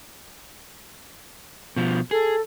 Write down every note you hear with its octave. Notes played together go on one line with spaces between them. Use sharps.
B2 F3
G#4 A4